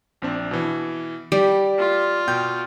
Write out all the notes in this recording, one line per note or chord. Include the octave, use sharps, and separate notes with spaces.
A#1 C4 D4
B2 E3
G3 G4
F4
B2 G5 G6